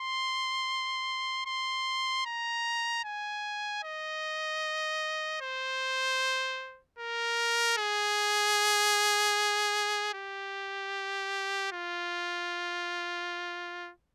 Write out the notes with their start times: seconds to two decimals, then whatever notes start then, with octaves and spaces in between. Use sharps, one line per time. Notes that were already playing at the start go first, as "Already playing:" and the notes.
Already playing: C6
1.46 C6
2.26 A#5
3.04 G#5
3.83 D#5
5.41 C5
6.99 A#4
7.78 G#4
10.14 G4
11.72 F4